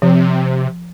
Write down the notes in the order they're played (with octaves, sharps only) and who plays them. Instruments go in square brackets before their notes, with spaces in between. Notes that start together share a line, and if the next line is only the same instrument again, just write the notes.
[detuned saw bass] C3 [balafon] F3